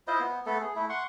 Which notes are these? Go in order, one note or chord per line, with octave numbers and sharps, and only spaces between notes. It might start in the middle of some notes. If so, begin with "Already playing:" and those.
E4 F4 C5 D#5
B3
A3 B3 A4
G#4
A3 E4
F#5 C6 C#6